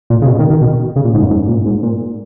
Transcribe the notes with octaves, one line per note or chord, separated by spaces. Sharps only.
A#2
C#3
B2
D#3
D#3
B2
C#3
A#2
G#2
F#2
G#2
A#2
G#2
A#2